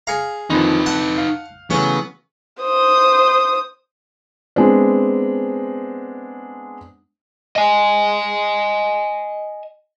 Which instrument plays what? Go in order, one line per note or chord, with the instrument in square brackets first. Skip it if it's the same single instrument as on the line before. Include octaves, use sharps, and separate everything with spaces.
[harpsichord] G#4 A#5 [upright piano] F5 C#7
[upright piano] F2 D3 B5 [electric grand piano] D#3 F3 [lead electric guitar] D#4 B4
[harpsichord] F#5 A5 [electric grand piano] F#6 G6
[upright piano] F5
[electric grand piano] C#3 E3 A3 [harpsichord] F#3 C#4 [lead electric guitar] B3 B4
[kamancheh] C5 D#6
[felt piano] G#3 B3 C4 D4
[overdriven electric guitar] D#5 G#5